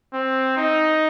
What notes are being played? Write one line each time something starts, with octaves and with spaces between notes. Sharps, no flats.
C4
D#4